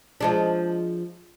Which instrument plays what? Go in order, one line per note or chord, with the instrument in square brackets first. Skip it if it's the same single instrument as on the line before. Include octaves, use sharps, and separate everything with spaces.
[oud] F3 G#3 D4